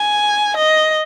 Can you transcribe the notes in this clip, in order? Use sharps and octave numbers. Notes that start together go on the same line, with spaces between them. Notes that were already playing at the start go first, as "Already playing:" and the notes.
Already playing: G#5
D#5